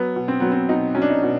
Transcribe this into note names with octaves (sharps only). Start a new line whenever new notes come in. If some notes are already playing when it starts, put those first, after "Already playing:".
Already playing: F#3 B3
B2
C4
F#3 B3
C4
B2 D#4
F#3 C#4
D4
D#4
B2